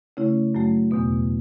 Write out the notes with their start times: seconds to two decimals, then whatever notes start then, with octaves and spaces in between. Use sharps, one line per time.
0.17 C#3 A3 C#4 E4
0.55 F#2 F#3 A3
0.91 E2 B2 B3